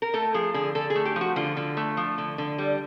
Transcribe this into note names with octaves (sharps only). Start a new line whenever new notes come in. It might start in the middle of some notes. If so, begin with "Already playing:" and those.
A#4
A3 A4
F3 G#4
D3 G#4
D3 A4
G#4
A3
G4
F3
F#4
D3 F4
D3
A3
F3
D3
D3
G3